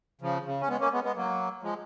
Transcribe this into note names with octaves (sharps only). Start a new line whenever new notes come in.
C#3 F3
C#3
C#4
G#3 B3
A#3 C#4
G#3 B3
G#3 B3
F#3 A#3
F3 G#3